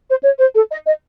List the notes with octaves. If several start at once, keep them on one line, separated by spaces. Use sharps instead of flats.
C5
C#5
C5
A4
D#5
D#5